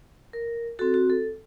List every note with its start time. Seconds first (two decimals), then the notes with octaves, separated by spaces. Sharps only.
0.33 A#4
0.79 C4 F#4 A4
0.94 F#4
1.10 A4